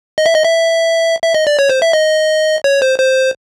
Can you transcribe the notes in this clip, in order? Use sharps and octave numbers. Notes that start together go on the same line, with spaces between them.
D#5
E5
D#5
E5
E5
D#5
D5
C#5
C5
E5
D#5
C#5
C5
C5